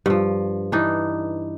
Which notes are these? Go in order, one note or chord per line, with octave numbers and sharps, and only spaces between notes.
G2 F3
E3 D4 D#4